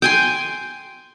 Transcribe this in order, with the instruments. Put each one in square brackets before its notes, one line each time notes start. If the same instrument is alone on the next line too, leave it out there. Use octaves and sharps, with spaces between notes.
[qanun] G5 G#5 C6